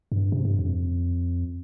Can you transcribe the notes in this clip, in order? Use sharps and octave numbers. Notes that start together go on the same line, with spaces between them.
G2
C3
G2
F2